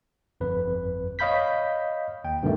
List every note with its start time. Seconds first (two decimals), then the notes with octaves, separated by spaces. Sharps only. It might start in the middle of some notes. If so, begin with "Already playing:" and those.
0.41 G1 F2 B4
1.19 C#5 D#5 F5 B5 G6 B6
2.24 D#2 G5
2.43 G2 B2 D3 D#3 A3